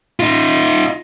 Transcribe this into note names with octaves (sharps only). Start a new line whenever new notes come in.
D#4 F4